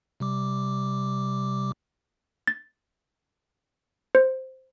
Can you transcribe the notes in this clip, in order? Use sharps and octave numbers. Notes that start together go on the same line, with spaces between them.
C3 G3 D6
A6
C5